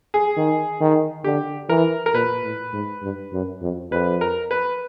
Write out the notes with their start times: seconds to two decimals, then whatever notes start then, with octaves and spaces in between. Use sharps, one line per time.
0.14 G#4
0.37 D#3
0.81 D#3
1.24 D3 G4
1.69 E3 A#4
2.06 A#4
2.14 A#2 B4
2.44 A2
2.73 G#2
3.02 G2
3.33 F#2
3.62 F2
3.91 F2 B4
4.21 A#4
4.51 B4